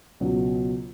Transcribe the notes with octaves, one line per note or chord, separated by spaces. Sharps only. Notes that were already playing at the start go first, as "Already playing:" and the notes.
C#2 B2 F#3